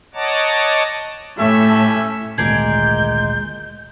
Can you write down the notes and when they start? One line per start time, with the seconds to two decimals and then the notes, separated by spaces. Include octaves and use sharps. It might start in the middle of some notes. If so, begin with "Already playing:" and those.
0.14 C#5 D#5 F#5 A5 A#5 D6
1.38 A2 A3 C#4 G4 E5
2.38 G#1 D2 A#2 G#3 G#4 A#4 D5 G6